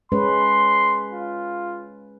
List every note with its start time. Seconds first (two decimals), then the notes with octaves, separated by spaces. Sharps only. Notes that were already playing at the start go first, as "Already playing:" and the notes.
0.12 G#3 C#4 B4 C6
1.13 F4